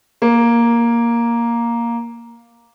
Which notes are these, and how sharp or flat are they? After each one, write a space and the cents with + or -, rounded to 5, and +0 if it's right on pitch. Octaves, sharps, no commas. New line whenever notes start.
A#3 +5